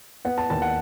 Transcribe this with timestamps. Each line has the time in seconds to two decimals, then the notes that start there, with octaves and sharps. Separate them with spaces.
0.25 B3 F#5
0.38 A5
0.50 D#2 A5
0.62 F#5